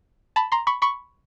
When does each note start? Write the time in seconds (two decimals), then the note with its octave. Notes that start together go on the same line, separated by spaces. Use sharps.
0.36 A5 B5
0.52 A#5 C6
0.67 B5 C#6
0.82 B5 C#6